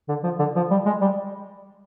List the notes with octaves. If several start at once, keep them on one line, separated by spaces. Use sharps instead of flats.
D3
F3
D3
F3
G3
G#3
G3